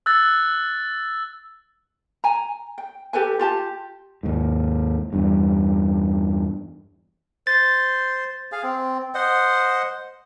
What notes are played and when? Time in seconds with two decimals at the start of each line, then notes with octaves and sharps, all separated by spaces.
0.06 E6 F#6 A6
2.24 G#5 A#5
2.78 G5
3.13 G4 A4 B4 G#5
3.39 F4 G4 A5
4.23 D#2 G#2
5.13 E2 G2
7.47 C5 A6
8.52 G#4 F5
8.63 C4
9.15 C5 D#5 F#5